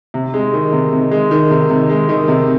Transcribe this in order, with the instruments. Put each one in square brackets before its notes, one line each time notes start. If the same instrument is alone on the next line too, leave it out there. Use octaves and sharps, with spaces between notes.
[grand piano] C3
G#3
D#3
C3
C3
G#3
D#3
C3
C3
G#3
D#3
C3